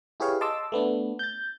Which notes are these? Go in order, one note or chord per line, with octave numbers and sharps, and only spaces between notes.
E4 G4 G#4 B4 C#5 F5
D#5 A5 C6 D6 E6
A3 B3 D4
G6 A6